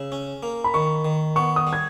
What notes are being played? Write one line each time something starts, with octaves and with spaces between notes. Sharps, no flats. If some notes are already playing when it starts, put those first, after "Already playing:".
Already playing: C#3 E6
C#4
A#3
B5
D#3 C#6
D#3
B3 C#6
D#6
G3
G#6